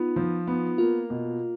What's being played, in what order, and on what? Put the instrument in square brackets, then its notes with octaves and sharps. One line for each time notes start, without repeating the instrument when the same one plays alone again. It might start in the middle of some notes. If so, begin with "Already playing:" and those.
Already playing: [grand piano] B3 [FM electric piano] D#4 F4
[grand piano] F3
B3
[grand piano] A#3 [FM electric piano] F4
[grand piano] B2